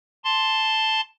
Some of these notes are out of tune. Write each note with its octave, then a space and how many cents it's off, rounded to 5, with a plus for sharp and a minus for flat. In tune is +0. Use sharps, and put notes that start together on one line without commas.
A5 +0 C6 +0